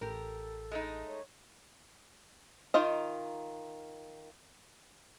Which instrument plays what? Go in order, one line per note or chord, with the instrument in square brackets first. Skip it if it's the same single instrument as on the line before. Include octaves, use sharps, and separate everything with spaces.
[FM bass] A1 [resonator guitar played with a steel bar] G4 A#4 [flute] A4
[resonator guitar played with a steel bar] G#3 A3 D#4
[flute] C#5
[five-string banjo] D#3 D#4 F4 D#5